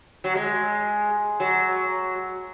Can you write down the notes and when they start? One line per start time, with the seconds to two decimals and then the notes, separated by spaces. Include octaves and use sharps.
0.24 F#3
0.35 G#3
1.40 F#3